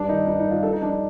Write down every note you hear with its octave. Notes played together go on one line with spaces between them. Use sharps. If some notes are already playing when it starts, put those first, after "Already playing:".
Already playing: G2 D4
D#3 D#4
G2 D#4
D#4
D#3
F4
G2 A4
D#4
F3 D4
D#4